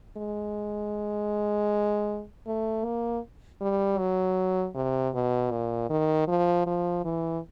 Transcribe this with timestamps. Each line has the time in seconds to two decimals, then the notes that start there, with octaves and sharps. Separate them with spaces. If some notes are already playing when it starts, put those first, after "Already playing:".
0.17 G#3
2.47 A3
2.85 A#3
3.61 G3
3.99 F#3
4.75 C3
5.14 B2
5.52 A#2
5.90 D#3
6.28 F3
6.67 F3
7.04 E3